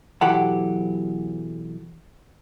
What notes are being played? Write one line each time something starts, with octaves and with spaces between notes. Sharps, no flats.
B1 E3 F#3 G4 A4 F#5